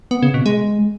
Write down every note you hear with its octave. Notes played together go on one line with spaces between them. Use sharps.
B3
C#3
B2
G#3